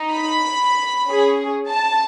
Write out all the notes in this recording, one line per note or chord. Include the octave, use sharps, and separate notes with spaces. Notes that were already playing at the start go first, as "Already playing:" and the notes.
Already playing: D#4
B5
C#4 G#4
A5